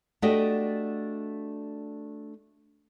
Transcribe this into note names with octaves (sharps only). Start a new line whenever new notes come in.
A3 D4 F#4 G4 D#5